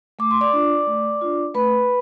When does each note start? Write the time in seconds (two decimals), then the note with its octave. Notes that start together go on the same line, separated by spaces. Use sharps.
0.19 A3 D6
0.31 C6
0.41 D5 D6
0.53 D4 F4
0.87 A3
1.21 D4 F4
1.54 A3 B4 B5